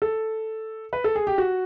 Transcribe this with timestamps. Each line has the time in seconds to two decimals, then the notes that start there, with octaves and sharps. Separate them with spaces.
0.02 A4
0.93 B4
1.04 A4
1.16 G#4
1.27 G4
1.38 F#4